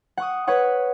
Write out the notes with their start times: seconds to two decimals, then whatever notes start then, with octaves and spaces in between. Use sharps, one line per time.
0.17 F#5 C#6 D#6
0.47 B4 C#5 F#5 C#6